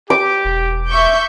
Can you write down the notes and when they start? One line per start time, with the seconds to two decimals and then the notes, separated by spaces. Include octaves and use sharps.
0.10 G4 D6
0.45 E1
0.89 E5 C#6 G6